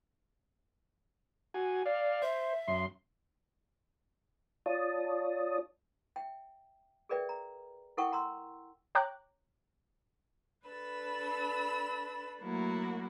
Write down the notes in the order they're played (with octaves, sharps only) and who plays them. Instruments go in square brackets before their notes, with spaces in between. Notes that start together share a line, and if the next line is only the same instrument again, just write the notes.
[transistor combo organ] F#4 G#5
D5 F5
[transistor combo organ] C5 [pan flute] E5
[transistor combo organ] F#2 C6
[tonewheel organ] F4 C#5 D5 A5 D#6
[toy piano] E5 G5
G#4 A#4 B4 D5 E5 G5
A#5
E4 A4 A#4 F#5 G5 C#6
F#5 A#5 C6 E6
[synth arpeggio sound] C#5 G5 A#5 D6 F#6
[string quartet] D4 A4 B4 B5 E6
F#3 A3 A#3 E4 F#4